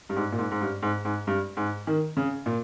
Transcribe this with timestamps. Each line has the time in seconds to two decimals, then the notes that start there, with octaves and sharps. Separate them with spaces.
0.09 G2
0.16 G#2
0.32 A#2
0.38 G#2
0.51 G#2
0.61 G2
0.82 G#2
1.05 G#2
1.27 G2
1.57 G#2
1.87 D#3
2.17 C#3
2.46 A#2